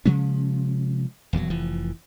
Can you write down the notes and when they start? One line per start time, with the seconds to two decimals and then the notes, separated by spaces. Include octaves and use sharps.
0.06 C3 F3 G#3 C#4
1.33 D#1 E2 E3 F#3
1.50 F1 E3 F3